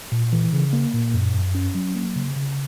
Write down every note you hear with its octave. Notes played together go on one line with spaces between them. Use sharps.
A#2
E3
C#3
A#3
A#2
F#2
F#2
C#4
F#3
A#3
C#3
C#3